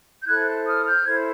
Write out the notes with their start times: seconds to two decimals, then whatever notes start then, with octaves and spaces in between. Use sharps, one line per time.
0.21 G6
0.27 E4 A4 C5 F#6 G#6
0.65 D#6 F6
0.84 F6 G6
1.03 E4 A4 C5 G#6